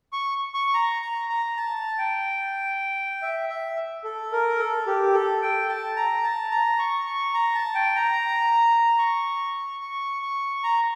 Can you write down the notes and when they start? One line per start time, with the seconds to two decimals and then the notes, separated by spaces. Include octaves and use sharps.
0.13 C#6
0.54 C#6
0.74 A#5
1.02 A#5
1.30 A#5
1.57 A5
1.98 G5
3.22 E5
3.49 E5
4.04 A4
4.32 A#4
4.59 A4
4.87 G4
5.14 A4
5.42 G5
5.69 A5
5.96 A#5
6.24 A5
6.51 A#5
6.79 C#6
7.07 C#6
7.34 A#5
7.54 A5
7.75 G5
7.96 A#5
8.98 C#6
9.81 C#6
10.22 C#6
10.64 A#5